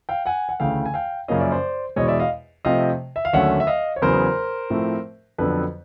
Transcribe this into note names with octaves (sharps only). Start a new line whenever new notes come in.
F5 G5
F#5 G#5
F#5
D2 C#3 E3 A3 F5 G5
G#5
F5 G5
F#2 C#3 F3 A#3 C#4 D#5 F5
D5 E5
C5 D5
E2 B2 G#3 C#5 D#5
D5 E5
D#5 F5
C3 F3 A3 C4 D#5 F5
E5
F5
D#2 D3 F#3 A3 C#4 E5 F#5
E5
D#5 F5
C#5
E2 C#3 F#3 B3 A#4 C5
A2 F3 A3 C4
F2 D3 F#3 B3 D4 A4 B4